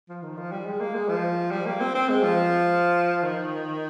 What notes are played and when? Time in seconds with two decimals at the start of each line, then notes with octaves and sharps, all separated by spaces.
0.09 F3
0.23 D#3
0.37 F3
0.52 G3
0.66 G#3
0.80 A#3
0.94 G#3
1.09 F3
1.51 G3
1.66 A#3
1.80 C4
1.95 C4
2.09 G#3
2.23 F3
3.23 D#3